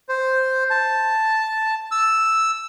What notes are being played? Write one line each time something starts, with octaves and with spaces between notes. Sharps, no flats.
C5
A5
E6